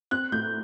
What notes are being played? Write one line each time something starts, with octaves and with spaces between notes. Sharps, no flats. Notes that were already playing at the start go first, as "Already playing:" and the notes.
C4 F#6
A2 G6